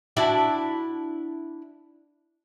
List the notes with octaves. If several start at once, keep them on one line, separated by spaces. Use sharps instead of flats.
D4 E4 F#4